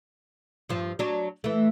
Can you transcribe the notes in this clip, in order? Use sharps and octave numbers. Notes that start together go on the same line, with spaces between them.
G2 F3
F#3 D4
E3 A3